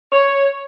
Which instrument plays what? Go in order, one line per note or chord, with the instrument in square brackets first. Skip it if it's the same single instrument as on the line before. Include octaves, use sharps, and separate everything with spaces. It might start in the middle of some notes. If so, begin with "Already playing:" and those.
[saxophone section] C#5